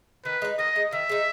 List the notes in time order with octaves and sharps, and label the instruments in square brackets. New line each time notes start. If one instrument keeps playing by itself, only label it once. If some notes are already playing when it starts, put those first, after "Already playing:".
[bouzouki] D#3 [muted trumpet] B4
[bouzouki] G#3 D#4
[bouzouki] D#3 [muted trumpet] D#5
[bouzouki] G#3 D#4
[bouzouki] D#3 [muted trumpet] E5
[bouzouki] G#3 D#4